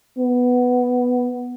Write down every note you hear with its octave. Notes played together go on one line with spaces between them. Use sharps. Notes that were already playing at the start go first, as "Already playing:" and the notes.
B3